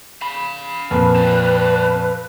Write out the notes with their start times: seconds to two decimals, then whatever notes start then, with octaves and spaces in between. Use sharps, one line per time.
0.21 F5 B5
0.91 F2 A#2 B4
1.15 C4 D5